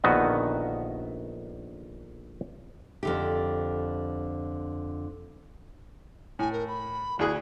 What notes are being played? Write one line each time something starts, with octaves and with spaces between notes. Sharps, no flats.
A#1 D3 D#3 B3 F#4 D#5
F2 D3 G4
A2 G#5
A#4
B5
D2 E4 G#4 F#6